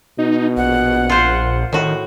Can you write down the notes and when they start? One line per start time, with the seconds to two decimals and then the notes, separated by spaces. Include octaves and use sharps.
0.18 B2 D#4
0.57 A#1 F#5
1.10 F4 C5
1.73 A2 D#3 F#4